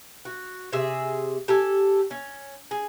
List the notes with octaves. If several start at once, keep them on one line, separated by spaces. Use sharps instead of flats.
F#4
C3 G#4 E5
G4 A4 G#5
C#4
G#4